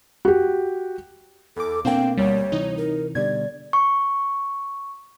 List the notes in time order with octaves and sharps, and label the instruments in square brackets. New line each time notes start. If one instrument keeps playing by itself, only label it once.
[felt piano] F#4 G4
[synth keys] E2 D6 [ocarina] A4
[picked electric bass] B2 A#3 [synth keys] C4 D4 G5 [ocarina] F5
[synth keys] D2 G3 [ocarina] C#5
[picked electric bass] C3 E3 [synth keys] D#4
[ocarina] A#4
[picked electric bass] B2 D3 G3 [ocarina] D5 [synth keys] G#6
[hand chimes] C#6